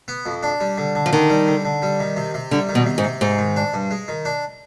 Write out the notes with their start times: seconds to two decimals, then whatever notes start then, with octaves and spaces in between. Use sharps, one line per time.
0.08 B3
0.26 F2
0.43 D4
0.60 G3
0.78 D3
0.95 D3
1.06 F3
1.13 D#3 D4
1.30 G3
1.48 D3
1.65 D3
1.82 G3
2.00 D#3
2.17 C3
2.34 C3
2.51 D3 G3
2.69 D#3
2.75 B2
2.86 C3
2.98 G#2
3.04 C3
3.21 G#2 G#3
3.38 D#3
3.56 D4
3.74 G2
3.91 G#3
4.08 D#3
4.25 D4